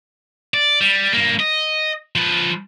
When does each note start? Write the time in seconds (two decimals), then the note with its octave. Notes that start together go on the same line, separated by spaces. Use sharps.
0.54 D5
0.81 G3
1.14 G2 A#3
1.40 D#5
2.16 F3 B4